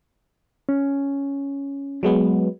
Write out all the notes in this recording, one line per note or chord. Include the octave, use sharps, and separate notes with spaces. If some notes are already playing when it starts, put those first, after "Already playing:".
C#4
F#3 G#3 B3